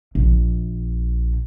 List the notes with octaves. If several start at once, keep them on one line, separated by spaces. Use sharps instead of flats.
A#1